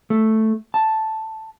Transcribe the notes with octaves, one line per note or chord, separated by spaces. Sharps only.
A3
A5